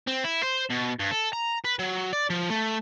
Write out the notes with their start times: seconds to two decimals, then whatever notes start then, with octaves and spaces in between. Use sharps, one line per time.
0.07 C4
0.24 E4
0.43 C5
0.70 B2
0.99 G2
1.11 A4
1.33 A#5
1.65 B4
1.79 F#3
2.13 D5
2.30 F3
2.50 A3